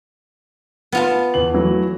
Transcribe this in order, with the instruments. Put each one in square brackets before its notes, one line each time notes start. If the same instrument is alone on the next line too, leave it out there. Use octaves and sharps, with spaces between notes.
[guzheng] B3 F4 A5
[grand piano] E2 F#7
E3 F#3 A3